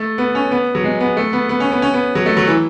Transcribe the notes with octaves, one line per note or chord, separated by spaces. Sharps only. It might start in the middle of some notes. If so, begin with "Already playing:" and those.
Already playing: A3
B3
C#4
B3
F#3
G#3
B3
A3
B3
B3
C#4
B3
C#4
B3
F#3
A3
F#3
E3